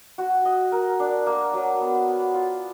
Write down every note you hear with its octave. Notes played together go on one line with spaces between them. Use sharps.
F#4
D#5
A#4
D4
A#3
F#3
B3
B3
F4